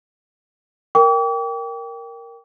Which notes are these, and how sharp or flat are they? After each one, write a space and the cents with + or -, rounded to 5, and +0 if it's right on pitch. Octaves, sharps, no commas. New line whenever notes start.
A#4 +0 G5 +0 D6 -45